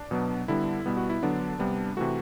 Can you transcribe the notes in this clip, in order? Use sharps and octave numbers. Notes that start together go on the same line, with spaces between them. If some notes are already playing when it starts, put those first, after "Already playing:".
Already playing: D4
B2 F#3 B3
D3 G3 B3 E4
B2 G3 B3
F#4
E4
D3 F#3 B3 D4
C3 G3 B3
C3 E3 A3 F#4